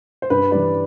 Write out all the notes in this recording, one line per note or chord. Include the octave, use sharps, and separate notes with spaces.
C5
G2 B4
E3 G3 B4 D5